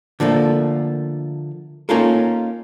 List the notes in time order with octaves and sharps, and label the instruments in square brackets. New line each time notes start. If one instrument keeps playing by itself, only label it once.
[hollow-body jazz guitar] D3 F3 A3 A#3
A#3 C#4 D#4 F4 A4 A#4